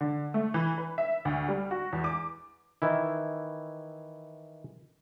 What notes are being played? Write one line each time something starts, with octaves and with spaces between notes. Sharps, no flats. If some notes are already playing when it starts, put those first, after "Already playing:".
D3
A3
E3
B4
E5
D2
G3
F#4
E2
D6
D#3 E3 E4